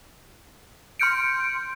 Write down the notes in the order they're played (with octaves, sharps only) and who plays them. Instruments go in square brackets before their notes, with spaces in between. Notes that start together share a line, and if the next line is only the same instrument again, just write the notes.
[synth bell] C6 F6 G6 C#7 D7